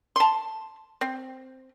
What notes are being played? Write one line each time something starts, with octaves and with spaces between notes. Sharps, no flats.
A5 C6
C4